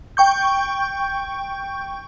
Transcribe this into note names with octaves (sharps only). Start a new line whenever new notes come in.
G5 C#6 G6